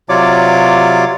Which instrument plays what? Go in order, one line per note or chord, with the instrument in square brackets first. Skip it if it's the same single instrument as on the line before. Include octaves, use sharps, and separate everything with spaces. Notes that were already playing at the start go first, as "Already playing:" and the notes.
[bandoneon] C3 F#3 F4 C#5 D5 D6